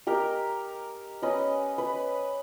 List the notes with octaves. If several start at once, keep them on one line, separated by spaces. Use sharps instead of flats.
G4 A#4 D#5
C#4 B4 D#5
B4